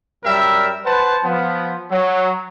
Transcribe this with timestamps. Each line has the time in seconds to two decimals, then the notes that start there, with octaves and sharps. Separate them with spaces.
0.24 F#2 G3 A#4 E5
0.85 B4 C5 F#5 A5
1.24 F3 B3
1.91 F#3